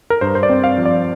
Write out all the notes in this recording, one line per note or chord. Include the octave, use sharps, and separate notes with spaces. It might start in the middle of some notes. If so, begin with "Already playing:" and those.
A#4
G2 C5
C5
D5
C4
F5
F3
D5